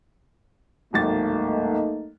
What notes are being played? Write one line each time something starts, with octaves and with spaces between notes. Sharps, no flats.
D1 G#1 A3 A#3 D#4 A6